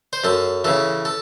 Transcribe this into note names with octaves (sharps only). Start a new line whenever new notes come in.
C5
F#2 A4
C#3 E3 A4
A4